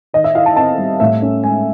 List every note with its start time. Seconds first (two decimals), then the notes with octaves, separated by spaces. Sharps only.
0.13 D#3 D#5
0.24 E5
0.35 E4 F5
0.46 A5
0.56 C4 A5
0.78 G3
1.00 A2 E5
1.22 C#4
1.44 G#3 G#5